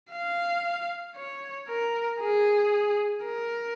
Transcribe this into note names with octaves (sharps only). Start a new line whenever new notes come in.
F5
C#5
A#4
G#4
A#4